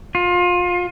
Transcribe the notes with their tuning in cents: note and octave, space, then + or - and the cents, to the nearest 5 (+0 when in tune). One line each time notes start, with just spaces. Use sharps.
F4 +25